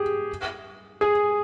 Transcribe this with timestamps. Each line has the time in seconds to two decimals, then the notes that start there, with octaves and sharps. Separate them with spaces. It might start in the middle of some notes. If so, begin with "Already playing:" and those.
Already playing: G4 G#4
1.01 G#4